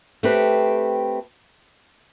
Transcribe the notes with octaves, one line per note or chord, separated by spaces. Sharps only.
A3 C4 G4 B4